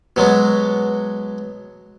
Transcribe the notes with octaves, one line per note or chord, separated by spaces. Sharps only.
B2 F#3 G#3 B3